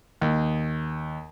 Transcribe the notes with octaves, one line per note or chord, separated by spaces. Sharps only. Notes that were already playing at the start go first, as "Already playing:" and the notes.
D#2